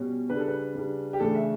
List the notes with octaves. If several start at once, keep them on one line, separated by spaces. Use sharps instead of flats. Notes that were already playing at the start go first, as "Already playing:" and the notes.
Already playing: B2 G3 C#4
C#3 G3 D4 B4
A4
B4
C#3 G3 D4
G4
C#3 E3 A3 D4 A4
E5